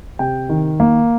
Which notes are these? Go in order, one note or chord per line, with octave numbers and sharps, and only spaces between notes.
C3 G5
D#3
A#3